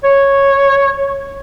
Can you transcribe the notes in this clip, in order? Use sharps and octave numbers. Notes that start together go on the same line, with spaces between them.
C#5